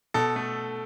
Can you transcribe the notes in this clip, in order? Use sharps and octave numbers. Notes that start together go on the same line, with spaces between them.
B2 A4
A3